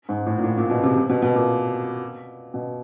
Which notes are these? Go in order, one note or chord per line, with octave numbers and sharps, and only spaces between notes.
G#2
A2
A#2
A2
A#2
B2
C3
C3
B2
B2
A#2
B2